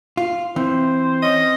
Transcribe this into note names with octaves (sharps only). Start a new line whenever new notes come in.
F4
E3 C4 C5
C#4 D#5